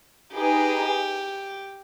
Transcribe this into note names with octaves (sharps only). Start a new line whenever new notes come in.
D#4 G4 G#4 B4